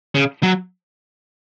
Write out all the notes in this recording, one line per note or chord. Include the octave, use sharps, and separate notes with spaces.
C#3
F#3